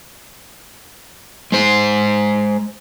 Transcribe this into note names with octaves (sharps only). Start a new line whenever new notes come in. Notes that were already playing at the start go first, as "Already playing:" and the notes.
G#3 C5